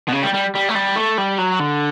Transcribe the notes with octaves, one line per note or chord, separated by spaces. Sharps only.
B2
C#3
G3
G3
G3
A3
G3
A3
G3
F#3
D3